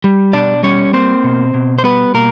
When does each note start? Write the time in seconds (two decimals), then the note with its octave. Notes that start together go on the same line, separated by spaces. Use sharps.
0.04 G3
0.33 B2 D4 D5
0.63 G3 C#4 C#5
0.93 A#3 C4 C5
1.24 B2
1.54 B2
1.78 C5
1.84 G3 B3 B4
2.14 B2 A#3 A#4